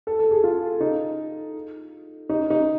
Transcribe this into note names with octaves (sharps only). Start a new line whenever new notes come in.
A4
A4
G#4
F4
D#4
D#4
D#4